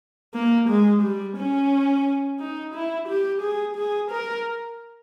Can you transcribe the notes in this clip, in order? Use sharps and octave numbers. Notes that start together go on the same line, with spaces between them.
A#3
G#3
G3
C#4
D#4
E4
G4
G#4
G#4
A#4